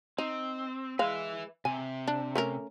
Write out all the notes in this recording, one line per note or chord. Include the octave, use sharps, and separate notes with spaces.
C4 D#4
G#3 B4 E5 F5
C3 G#5
D4
A3 C#4 A#4